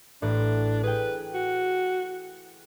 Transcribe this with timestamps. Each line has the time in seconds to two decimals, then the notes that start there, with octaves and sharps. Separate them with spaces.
0.22 A1 A2 D4
0.83 G#4 B4 G5
1.34 F#4